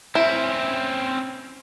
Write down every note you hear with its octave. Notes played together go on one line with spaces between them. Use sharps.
C4 C#4 E4